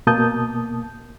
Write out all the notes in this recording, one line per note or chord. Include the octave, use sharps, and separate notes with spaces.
B2 A#3 A5 D#6 G6